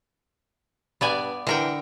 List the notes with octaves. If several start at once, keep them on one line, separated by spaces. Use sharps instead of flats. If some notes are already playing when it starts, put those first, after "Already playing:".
G2 B3 D5 G#5
D3 E3 A#4 G5